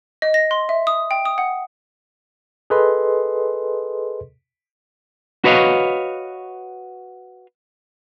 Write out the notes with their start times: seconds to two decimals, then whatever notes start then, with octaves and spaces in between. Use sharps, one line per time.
0.22 D#5
0.34 A#6
0.51 C6
0.69 E5
0.87 D#6
1.11 G5
1.26 D#6
1.38 F#5
2.70 G#4 A4 B4 D#5 C6
5.44 F#4 B4 C#5 D#5 F5